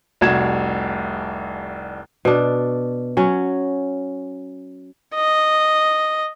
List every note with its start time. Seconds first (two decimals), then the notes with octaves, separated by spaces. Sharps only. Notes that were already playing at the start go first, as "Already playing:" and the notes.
0.21 F1 C2 F#4 G#6 E7
2.25 B2 D4
3.17 F#3 C#4
5.15 D#5